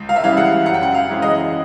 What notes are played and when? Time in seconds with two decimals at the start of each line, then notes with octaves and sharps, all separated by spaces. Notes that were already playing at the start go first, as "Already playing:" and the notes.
Already playing: C#2
0.09 F5
0.16 E5
0.24 C#3 E3 G3 F5
0.37 F#5
0.66 F#2 F#5
0.74 G5
0.83 F#5
0.94 F5
1.08 C#3 E3 G#3
1.22 D#5